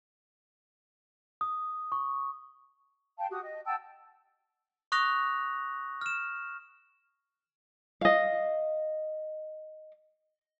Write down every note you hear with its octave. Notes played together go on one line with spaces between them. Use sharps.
D#6
C#6
F5 G5 A5
F#4 G4 D#6
D#5
F#5 G5 A5 E6
C#6 D#6 F#6 A#6 F7
F6 E7
D#5 F5